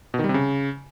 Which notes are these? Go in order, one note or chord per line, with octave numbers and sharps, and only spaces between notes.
B2
D#3
G3
C3
C#3